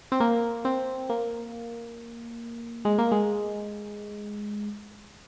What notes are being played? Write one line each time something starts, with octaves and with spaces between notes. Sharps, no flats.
C4
A#3
C4
A#3
G#3
A#3
G#3